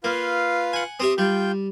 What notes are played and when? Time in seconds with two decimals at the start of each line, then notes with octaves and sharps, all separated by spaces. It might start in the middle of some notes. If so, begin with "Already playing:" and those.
0.04 A#3 F4 B4 F5
0.73 F#5 G#5
1.00 C4 G4 E5 D#6
1.18 G3 F4 G5 G6